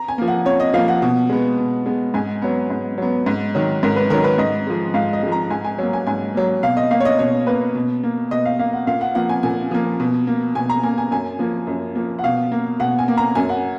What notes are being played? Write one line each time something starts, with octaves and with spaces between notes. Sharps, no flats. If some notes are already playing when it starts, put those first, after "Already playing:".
Already playing: A#5
G#5
F3 A#3
F#5
F2 C#5
D#5
F3 A#3 F5
F#5
B2
G#3 B3
B2
G#3 B3
G#2 G#5
F#3 B3
G#2
F#3 B3
G#2
D#3 F#3
G#2 A#4
B4
D#3 F#3 A#4
B4
G#2 D#5
F3 G#3
G#2 F5
D#5
F3 G#3
A#5
G#2 G#5
G#5
F#3 A#3
G#5
G#2 G#5
F#3 A#3
B2 F5
D#5
A#3 F5
C#5
D#5
B2 C#5
A#3 B4
B2
A#3
B2 D#5
F5
A#3 F5
F#5
A#2 F5
F#5
F3 A#3 F#5
G#5
A#2 G#5
F3 A#3
B2
A#3
B2 G#5
A#5
A#3 G#5
G#5
F#2 G#5
F3 A#3
F#2
F3 A#3
F#5
B2 F5
A#3
B2 F#5
G#5
A#3
A#5
F#2 G#5
F#5